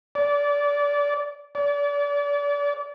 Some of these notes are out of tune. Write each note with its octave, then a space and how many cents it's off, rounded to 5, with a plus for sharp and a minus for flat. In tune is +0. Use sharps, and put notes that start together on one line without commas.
D5 -25
D5 -35